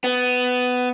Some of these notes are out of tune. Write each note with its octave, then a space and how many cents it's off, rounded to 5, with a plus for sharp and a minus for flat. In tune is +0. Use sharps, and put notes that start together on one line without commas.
B3 +15